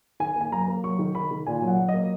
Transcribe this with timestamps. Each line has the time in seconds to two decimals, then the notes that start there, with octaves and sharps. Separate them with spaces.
0.20 D#3 G#5
0.36 A#3
0.41 G#5
0.52 F#2 A#5
0.68 A#3
0.83 F#3 C#6
0.99 D#3
1.15 D#3 B5
1.31 D#3
1.46 A#2 G#5
1.62 F#3
1.67 F#5
1.79 F#3
1.88 D#5
1.94 A#3